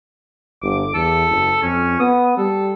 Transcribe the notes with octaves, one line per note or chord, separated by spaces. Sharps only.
G1 D6
E2 A4
F#1
F2 C#4
B3 D#6
G3 A4